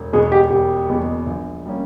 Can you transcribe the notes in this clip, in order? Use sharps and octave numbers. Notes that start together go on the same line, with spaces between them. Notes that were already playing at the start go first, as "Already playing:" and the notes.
Already playing: E1
E2 B2 G#3 B3 G#4
G4
E1 G4
E2 B2 G#3 B3
A#1
G3 A#3 C#4